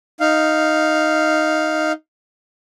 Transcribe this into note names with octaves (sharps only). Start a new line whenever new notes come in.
D#4 F5